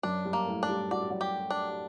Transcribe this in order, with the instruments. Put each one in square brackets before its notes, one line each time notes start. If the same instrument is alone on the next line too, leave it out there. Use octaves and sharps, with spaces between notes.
[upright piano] F#2 F#3 [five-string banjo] D4
[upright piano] G2 G3
[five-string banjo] A#3
[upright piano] A2 A3
[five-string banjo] D4
[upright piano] G3 G4
[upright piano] F#4 [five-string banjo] D5
[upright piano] G4
F#3 F#4
[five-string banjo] G4
D4